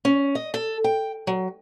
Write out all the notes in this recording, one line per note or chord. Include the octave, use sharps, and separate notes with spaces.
C#4
D#5
A4
G5
F#3